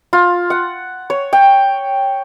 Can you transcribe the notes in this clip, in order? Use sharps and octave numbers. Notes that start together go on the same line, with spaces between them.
F4
F#5
C#5
G5